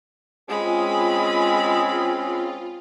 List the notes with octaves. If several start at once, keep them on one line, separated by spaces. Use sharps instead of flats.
G#3 C4 C#4 F4 G#4 B5